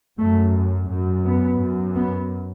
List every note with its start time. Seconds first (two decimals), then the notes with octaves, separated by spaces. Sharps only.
0.19 F#2 A3
0.90 F#2
1.25 B3
1.60 F#2
1.95 B3